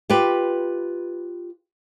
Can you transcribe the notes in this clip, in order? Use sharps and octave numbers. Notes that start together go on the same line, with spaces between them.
F4 G4 B4